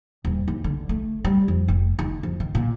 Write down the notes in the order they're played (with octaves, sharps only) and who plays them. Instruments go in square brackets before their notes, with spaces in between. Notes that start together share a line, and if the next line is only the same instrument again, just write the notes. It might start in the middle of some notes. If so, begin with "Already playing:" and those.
[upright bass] D#1
D#2
D3
A3
G3
F2
F1
D#3
F2
D#3
A#2